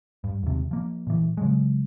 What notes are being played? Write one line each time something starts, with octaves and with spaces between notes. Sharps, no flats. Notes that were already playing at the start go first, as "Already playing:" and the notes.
G2
D#2 C3
F3 A#3
A#2 E3
C#3 F#3 G#3